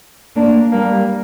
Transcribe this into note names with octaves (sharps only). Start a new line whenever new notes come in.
A#3 D4
G3 A#3